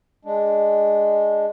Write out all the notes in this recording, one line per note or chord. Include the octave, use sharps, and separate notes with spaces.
G#3 D4